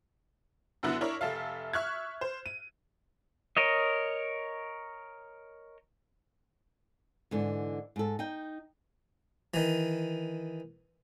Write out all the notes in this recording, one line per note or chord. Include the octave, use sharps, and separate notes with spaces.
F#2 D3 B3 E4 F#4
D4 E4 A#4 C#5
F1 A4 E5 F5
E5 C#6 F6 F#6 G#6
C5
D#7
A#4 C#5 D#5
G#2 D3 E3
G#2 A4
D#4 G5
D#3 E3